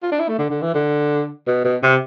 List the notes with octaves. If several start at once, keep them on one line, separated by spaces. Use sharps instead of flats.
F4
D4
E4
A3
D3
D3
E3
D3
B2
B2
C3